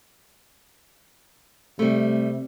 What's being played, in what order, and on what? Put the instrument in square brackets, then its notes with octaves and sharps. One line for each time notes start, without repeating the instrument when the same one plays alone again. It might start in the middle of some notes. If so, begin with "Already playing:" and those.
[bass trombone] C3 [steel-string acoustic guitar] G3 A3